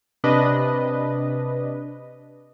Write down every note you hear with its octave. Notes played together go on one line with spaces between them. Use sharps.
C3 D4 B4 D#5